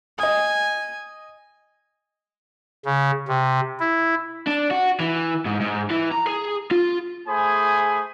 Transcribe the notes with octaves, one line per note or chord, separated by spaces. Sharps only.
D#5 G#5 D#6
C#3
C3
E4
D4
F#4
E3
G#2
G#2
E3
A#5
G#4
F4
A3 G#4 C5 G#5 B5 D#6